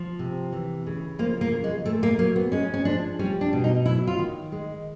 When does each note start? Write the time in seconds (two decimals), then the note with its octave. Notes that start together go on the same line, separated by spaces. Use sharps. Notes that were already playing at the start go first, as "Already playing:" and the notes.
Already playing: F3
0.19 C3
0.52 E3
0.86 C#3
1.19 F3 A#3
1.41 A#3
1.52 C#3
1.64 G#3
1.85 A#2 A3
2.03 A#3
2.19 F#3 A#3
2.36 B3
2.52 G#3 C#4
2.74 C#4
2.85 F3 D4
3.19 G3 C#4
3.41 D4
3.53 B2
3.64 D#4
3.86 F#3 E4
4.07 F4
4.19 D#3
4.52 G#3